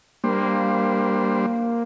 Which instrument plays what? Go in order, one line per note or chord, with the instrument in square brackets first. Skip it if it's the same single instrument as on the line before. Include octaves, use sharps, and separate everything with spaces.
[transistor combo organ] G3 D4 C5 [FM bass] A#3